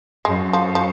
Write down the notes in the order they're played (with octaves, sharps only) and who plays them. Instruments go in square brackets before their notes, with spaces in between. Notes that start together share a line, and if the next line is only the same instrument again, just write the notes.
[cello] F#2 [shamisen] G#3
[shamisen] F3
F3